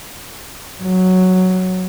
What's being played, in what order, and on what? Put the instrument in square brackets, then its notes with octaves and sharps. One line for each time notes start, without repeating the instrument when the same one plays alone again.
[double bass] F#3